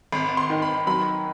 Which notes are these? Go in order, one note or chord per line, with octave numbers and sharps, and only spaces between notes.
G#1 B5
C6
D#3
B5
F#3 B5